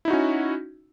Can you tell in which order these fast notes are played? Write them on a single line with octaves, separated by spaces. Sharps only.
E4 D#4 F#4 C#4